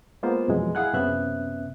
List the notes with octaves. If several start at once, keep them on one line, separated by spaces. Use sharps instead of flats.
G#3 A#3 B3 F4 C5
F2 B2 E3 F#3 G#3
E4 G#4 F5 F#5 G#5 F#6
F#2 C3 B3 C#4 E5 F#6